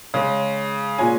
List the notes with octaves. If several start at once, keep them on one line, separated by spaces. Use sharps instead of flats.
C#3 G#3 C#4
A#2 G#3 C#4 G#5